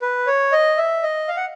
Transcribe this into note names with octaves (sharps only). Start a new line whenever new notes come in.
B4
C#5
D#5
E5
D#5
F5
F#5